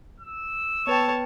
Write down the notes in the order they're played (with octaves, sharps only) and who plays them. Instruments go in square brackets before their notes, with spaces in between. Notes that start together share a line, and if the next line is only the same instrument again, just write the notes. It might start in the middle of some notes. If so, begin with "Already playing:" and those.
[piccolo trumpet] E6
[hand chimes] B3 B4 G5 [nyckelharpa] C#5 A5